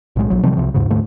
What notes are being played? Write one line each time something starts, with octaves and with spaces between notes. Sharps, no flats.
B1 A2 E3 G#3
A#1 F#3
C3 D#3 F3 G3
C2 C3 F3
D#2 G#2 C#3
D2 G#2 D3 A3